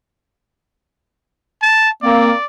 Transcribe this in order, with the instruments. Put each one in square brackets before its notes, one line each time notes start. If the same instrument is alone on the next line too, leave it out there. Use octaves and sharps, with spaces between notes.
[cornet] A5
[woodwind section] A#3 C4 [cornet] D5